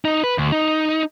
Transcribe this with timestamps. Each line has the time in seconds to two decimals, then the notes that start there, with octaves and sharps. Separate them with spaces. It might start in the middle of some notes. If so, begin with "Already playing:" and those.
0.05 D#4
0.23 B4
0.38 D2
0.52 D#4